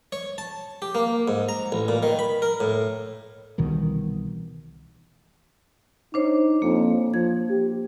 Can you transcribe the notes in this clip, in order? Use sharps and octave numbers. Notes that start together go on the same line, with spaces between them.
C#5
A5
G4
A#3
G#2
A#5
A1
A#2
D#3
B5
A#4
A2
C2 B2 D#3 E3
D4 D#4 C5 C#5
F2 A#3
F3 G#6
G4